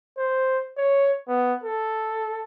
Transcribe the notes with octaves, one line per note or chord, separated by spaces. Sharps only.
C5
C#5
B3
A4